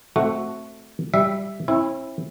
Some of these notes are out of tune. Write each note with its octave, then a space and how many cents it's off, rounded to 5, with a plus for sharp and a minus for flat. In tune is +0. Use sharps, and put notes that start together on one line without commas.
A3 +0 C4 +0 F#4 +0
G3 +5 E5 +0
C4 +45 E4 +0